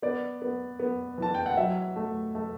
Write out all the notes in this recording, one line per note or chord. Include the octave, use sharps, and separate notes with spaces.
B3 D5
B3
B3
E3 A5
G5
F#5
F#3 E5
A3
A3